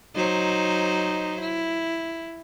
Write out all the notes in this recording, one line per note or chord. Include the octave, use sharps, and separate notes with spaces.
F#3 D#4 C5
E4